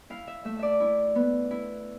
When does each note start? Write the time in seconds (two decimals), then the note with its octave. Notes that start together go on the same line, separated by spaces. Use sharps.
0.10 E4 F5
0.27 E5
0.45 A3 E5
0.59 D5 E5
0.80 E4
1.15 B3
1.51 E4